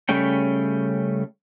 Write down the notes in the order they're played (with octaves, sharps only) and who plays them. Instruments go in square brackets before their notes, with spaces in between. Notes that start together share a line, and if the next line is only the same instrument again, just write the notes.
[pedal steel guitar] C#3 G3 A3 C#4 G5